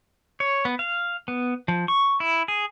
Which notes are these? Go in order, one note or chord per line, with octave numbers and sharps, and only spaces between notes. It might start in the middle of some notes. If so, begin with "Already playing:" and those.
C#5
B3
F5
B3
F3
C#6
E4
G#4